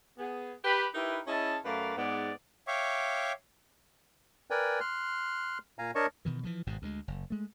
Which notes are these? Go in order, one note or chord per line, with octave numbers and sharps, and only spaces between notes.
B3 G#4
G4 B4 B5
D#4 E4 G4 A#4 B4
C#4 E4 G#4 D#5 A5
F#2 A3 A#4 B4 D5 F5
G#2 B3 D5
C#5 E5 F5 G5 C#6 D6
A#4 B4 D5 G5 G#5
C6 F6 F#6
A#2 F5 G#5 A#5
D4 A#4 C#5 D#5 A5 C#6
B2 D#3 E3
E3 F3 G#3
G#1 G#2 B2
D2 D#3 G#3
F#1
G#3 A3